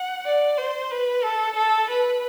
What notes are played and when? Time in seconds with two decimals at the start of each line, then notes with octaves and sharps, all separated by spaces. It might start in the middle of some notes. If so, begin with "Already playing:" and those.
Already playing: F#5
0.26 D5
0.58 C5
0.91 B4
1.23 A4
1.57 A4
1.90 B4